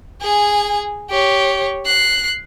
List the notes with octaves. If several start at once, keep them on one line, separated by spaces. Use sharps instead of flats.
G#4 G#5
G4 C#5
F#6 C7